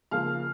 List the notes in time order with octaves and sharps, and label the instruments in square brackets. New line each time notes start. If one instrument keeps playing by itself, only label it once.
[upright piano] C#3 F3 A#3 F5 F6